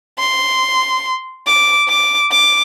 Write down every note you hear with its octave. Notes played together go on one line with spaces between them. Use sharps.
C6
D6
D6
D6